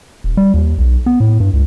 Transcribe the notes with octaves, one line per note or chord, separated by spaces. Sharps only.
D#1
G3
D#2
B1
B3
A2
G2
C#2